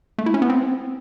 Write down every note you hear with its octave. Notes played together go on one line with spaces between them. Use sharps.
A3
E4
C#4
B3
C4